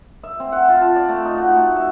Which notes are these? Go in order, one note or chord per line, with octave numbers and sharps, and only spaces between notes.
E5
C4
F#5
F4
A5
D5
A3
D#4
F#4
A3
E5